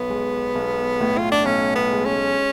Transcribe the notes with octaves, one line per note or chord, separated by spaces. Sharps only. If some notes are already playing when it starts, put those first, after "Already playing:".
Already playing: B1 B3
G#3
B1
A2
F4
D4
B1 C#4
B3
G#3
C#4